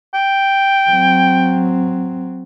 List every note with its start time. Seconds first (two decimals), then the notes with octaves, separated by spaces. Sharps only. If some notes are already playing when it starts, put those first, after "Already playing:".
0.14 G5
0.90 F#3 C4